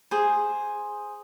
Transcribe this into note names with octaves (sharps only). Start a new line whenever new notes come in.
G#4 C5